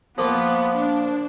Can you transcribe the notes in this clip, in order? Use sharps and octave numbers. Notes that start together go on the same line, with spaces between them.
F3 A#3 B3 F4
D4